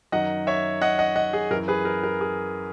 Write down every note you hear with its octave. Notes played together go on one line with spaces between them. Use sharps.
F#2 D#3 F#3 D#5 F#5
C#5 E5
D#5 F#5
D#5 F#5
D#5 F#5
G#4
F#2 E3 A#4
G#4 B4
A#4
A#4
G#4